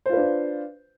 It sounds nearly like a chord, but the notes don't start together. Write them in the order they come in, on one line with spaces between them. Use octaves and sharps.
C5 F4 B4 D4